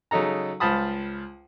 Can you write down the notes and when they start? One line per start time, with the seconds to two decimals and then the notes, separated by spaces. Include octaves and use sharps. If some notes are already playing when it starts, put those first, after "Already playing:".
0.11 C#3 F#3 D#4 A4 A#5
0.60 C#2 C5 F5 A5 B5 D#6